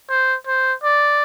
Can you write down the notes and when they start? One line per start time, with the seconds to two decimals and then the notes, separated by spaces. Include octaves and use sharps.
0.09 C5
0.47 C5
0.83 D5